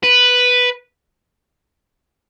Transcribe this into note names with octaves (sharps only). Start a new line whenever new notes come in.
B4